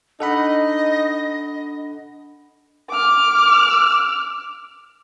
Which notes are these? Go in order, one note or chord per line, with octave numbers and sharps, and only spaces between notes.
D4 D#4 A4 D#5 F#5 B5
D6 F6